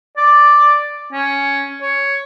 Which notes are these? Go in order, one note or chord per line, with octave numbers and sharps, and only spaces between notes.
D5
C#4
C#5